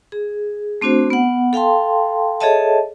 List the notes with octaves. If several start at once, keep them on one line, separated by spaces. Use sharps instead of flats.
G#4
A3 C4 D4 F#4 C5
B3 F#5
A4 F5 G5 A5 C6
G#4 A4 C#5 D#5 E5 A5